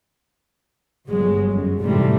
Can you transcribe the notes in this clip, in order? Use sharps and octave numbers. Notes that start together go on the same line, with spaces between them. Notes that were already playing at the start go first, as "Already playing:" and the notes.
G1 F#3 G#3
F#2
A1 G#2 C3 E3 G3 A3